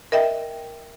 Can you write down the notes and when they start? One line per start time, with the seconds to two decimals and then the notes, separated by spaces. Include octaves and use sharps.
0.12 A#4 D#5 E5 G5